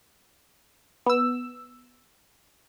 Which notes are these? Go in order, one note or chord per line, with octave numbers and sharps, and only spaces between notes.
B3 E6